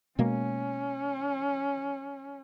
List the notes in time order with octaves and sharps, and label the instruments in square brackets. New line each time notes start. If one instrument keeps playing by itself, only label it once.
[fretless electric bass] B2 G#3 A#3 [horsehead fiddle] C#4